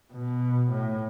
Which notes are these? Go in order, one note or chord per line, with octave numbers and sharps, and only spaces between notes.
B2
A2